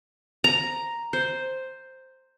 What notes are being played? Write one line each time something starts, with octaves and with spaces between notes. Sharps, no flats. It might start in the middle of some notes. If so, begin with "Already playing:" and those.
A#5
C5